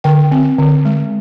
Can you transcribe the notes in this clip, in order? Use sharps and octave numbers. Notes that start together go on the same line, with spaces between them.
D3 G5
C4
D3
G#3